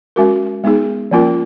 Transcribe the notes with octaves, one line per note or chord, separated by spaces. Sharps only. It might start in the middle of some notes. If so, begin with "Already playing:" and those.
G#3 C#4 F#4 A#4
G#3 B3 D#4 G#4
F3 A#3 C#4 F4 A#4